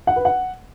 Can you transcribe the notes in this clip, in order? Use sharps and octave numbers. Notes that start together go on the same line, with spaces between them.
F#5
B4
F#5